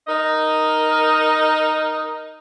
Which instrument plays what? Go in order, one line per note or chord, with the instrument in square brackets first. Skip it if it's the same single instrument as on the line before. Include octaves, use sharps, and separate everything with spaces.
[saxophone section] D#4 A#4 D#5